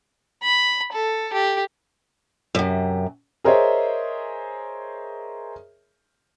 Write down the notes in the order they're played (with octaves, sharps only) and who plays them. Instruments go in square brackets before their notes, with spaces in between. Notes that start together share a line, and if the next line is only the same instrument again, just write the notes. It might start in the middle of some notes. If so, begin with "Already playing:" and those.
[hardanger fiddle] B5
A4
G4
[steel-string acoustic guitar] F#2 C3
[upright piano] G#4 A#4 C5 C#5 D#5 E5